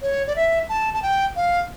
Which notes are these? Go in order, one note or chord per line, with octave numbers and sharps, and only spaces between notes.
C#5
D5
E5
A5
A5
G5
F5